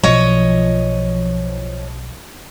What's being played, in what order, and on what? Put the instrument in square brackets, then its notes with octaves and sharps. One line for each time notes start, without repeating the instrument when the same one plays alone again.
[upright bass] B1 [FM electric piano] F3 [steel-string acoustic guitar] C#5 D#5